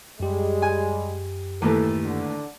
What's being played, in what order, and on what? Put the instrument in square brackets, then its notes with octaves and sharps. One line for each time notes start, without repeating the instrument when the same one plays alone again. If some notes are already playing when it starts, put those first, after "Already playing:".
[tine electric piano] F#2 G4 [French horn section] G3 G#3
[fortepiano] G#5
[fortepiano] D#2 A2 E3 [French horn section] A4
[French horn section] D3